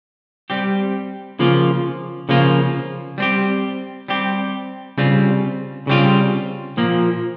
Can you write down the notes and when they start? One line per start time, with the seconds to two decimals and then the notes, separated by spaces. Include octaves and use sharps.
0.50 G3 C4 G4
1.39 C#3 F3 A#3 F4
2.29 C#3 F3 A#3 F4
3.18 G3 C4 G4
4.08 G3 C4 G4
4.98 C#3 G3 C4 F4
5.87 C#3 G3 C4 F4
6.77 A#2 F3 A#3